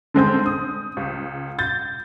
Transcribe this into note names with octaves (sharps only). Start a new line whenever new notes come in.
D3 G#3 C4 G6
D#6
C#2
G6 A6